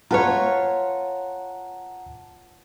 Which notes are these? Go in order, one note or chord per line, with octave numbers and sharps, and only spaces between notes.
F4 B4 C#5 F#5 A5 A#5